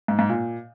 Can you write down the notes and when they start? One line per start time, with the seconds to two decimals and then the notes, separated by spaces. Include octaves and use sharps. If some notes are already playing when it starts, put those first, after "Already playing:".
0.08 G#2
0.19 G#2
0.29 A#2